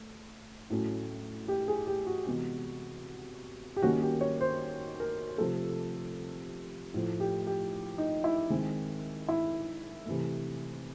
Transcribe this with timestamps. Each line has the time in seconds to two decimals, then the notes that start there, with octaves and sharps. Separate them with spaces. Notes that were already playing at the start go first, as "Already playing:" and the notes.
Already playing: A3
0.70 A2 F#3 A3 C#4
1.48 G4
1.68 G#4
1.87 G4
2.07 F#4
2.27 C3 E3 G#3 B3
3.76 G4
3.82 D#3 G3 A#3 C#4 F#4
4.02 G4
4.21 C#5
4.41 C5
5.00 A#4
5.38 C3 F3 A3 A4
6.94 A2 F3 A3
7.20 G4
7.47 G4
7.98 D#4
8.24 E4
8.50 D#3 G#3 C4
9.29 E4
10.06 C3 E3 A3